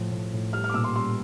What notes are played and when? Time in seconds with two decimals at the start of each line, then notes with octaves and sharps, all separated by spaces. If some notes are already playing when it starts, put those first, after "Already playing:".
Already playing: A2 F3
0.11 A2
0.33 A2
0.53 G3 F6
0.64 F6
0.69 D6
0.74 A#2 E6
0.84 C6
0.95 G3 C6